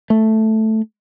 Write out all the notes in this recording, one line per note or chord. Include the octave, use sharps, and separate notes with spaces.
A3